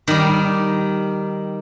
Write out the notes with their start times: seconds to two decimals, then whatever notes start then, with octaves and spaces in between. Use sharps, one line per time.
0.08 D#3 G3